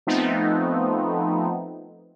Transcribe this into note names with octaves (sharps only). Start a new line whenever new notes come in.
F3 A3 B3 C4 D#4